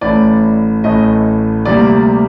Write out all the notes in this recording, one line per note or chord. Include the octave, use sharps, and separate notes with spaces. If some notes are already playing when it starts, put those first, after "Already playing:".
A1 A2 A3 D5
A1 A2 A3 D#5
D2 C3 G3 A#3 D5